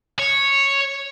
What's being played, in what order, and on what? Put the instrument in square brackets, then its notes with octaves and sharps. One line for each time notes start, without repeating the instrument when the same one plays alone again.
[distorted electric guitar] C#5